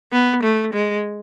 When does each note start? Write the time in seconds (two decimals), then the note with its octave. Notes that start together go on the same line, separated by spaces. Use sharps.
0.12 B3
0.43 A3
0.73 G#3